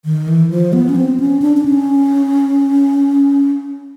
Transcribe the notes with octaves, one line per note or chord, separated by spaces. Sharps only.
D#3
E3
F3
B3
C#4
C4
C#4
D4
D4
C#4